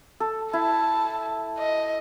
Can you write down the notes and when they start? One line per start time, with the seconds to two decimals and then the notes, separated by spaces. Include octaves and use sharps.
0.20 A4
0.53 E4 A5
1.58 D#5